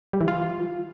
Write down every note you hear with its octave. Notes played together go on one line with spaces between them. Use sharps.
G3
E3
F4